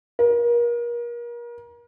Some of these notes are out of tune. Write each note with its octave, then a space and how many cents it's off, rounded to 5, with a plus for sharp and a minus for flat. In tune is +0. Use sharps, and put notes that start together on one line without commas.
A#4 +35